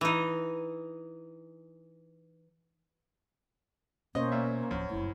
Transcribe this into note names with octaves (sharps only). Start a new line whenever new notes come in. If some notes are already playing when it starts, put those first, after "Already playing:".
E3 D#4
B2 A#3 C#4 C5 C#5 D#5
A#2 E5
D1 F#2 F3
F#1 A3 E4